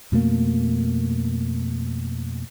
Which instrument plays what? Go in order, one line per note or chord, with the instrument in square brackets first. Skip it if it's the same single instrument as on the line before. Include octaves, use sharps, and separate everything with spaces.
[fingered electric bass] F2 B2 A3 A#3